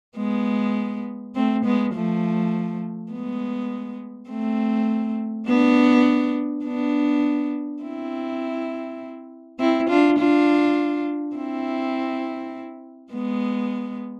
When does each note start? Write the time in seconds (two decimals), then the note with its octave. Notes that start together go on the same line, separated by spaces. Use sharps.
0.17 G#3 B3
1.35 A3 C4
1.65 G#3 B3
1.94 F3 A3
3.12 G#3 B3
4.30 A3 C4
5.47 B3 D4
6.65 B3 D4
7.83 C4 E4
9.60 C4 E4
9.89 D4 F4
10.18 D4 F4
11.36 C4 E4
13.13 G#3 B3